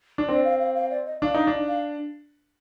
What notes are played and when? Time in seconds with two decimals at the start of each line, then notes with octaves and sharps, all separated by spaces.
0.18 D4
0.29 C4 D5
0.45 F5
0.60 F5
0.75 F5
0.90 D5
1.06 D#5
1.22 D4 F5
1.34 D#4
1.47 D4
1.68 F5